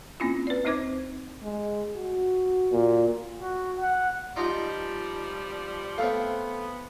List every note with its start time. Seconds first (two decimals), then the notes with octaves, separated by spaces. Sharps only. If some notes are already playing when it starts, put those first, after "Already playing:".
0.20 A#3 C4 C#4 E4 F4
0.47 B4 D5
0.65 D2 C4 D#4 C5 D6 G#6
1.43 G#3
1.96 F#4
2.72 A#2
3.40 F#4
3.79 F#5
4.36 F3 G3 D#4 F4 A#5
5.98 A3 B3 C4 F5